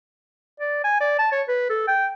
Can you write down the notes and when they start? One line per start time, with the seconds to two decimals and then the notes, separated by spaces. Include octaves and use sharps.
0.60 D5
0.84 G#5
1.00 D5
1.19 A5
1.32 C#5
1.48 B4
1.70 A4
1.88 G5